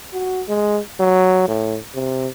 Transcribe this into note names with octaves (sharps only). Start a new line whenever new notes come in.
F#4
G#3
F#3
A2
C3